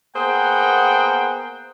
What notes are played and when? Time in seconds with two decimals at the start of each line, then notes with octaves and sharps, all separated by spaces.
0.16 A#3 B3 G#4 C5 F#5 G5